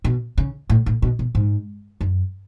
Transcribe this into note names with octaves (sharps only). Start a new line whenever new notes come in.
B2
C#3
A2
A2
B2
B2
G#2
F#2